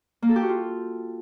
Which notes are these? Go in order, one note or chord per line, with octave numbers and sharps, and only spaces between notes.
A#3
A4
G4
F#4
F4